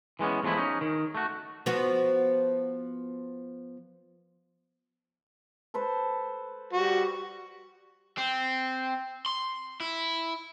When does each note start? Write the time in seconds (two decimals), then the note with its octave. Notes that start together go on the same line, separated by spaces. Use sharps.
0.19 E3 G#3 B3 C#4
0.43 E2 F3 G#3 A3 E4
0.57 C#4 D#4
0.81 D#3
1.15 A3 F#4
1.66 F3 B3 F#4
5.74 A4 B4 C5
6.73 G3 F#4
8.18 C4
9.26 C6
9.80 E4